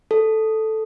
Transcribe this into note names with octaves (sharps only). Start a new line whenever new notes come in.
A4